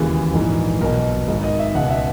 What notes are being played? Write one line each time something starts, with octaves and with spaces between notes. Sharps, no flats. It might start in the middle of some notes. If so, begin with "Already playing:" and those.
Already playing: E1 D#2 C#3 E3 G#4
A#1 G#2 E3
B1 B2 A#4
G#1 G#2 D#3
D#5
E5
C#2 B2 F#5
E5